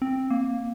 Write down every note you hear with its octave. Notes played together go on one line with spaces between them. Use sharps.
C4
A#3